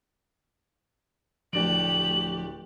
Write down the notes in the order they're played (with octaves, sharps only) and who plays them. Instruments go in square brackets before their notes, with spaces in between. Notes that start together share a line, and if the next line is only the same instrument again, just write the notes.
[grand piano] D1 D4 D7 [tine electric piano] F3 [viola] A3 G4 [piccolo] F#7